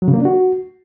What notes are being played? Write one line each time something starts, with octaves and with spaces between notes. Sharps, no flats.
F#3
C#3
A#3
D4
F#4